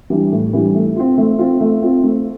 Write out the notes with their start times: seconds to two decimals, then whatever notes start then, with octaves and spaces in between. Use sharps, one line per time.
0.10 E3 G3 D4
0.32 A2
0.53 E3 G3 D4
0.75 A3
0.96 C4 F4
1.18 A3
1.39 C4 F4
1.61 A3
1.83 C4 F4
2.04 A3